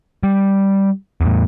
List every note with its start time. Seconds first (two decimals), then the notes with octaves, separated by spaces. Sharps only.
0.23 G3
1.21 E2 A2